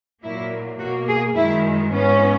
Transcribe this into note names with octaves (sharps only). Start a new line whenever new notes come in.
A#2 F#3 A#3 E4
B2 A#3 F#4
G#4
F#2 D#3 G#3 E4
G#2 E3 B3 C#4